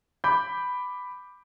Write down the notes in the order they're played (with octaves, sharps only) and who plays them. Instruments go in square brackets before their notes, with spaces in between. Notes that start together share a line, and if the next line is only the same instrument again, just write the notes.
[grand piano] B5 D6 G6